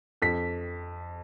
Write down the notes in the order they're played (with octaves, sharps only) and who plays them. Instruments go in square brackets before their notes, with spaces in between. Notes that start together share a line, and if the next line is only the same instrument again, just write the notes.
[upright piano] F2 B6